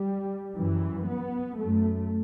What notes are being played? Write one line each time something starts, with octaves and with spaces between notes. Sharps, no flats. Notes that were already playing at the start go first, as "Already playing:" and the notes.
Already playing: G3
F#2 E3
B3
F#2 A3